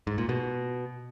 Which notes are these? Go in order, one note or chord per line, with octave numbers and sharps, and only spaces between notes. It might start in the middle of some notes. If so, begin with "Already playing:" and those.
G#2
A#2
B2